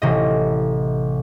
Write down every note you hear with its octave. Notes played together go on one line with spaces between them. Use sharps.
A1 C3 D#5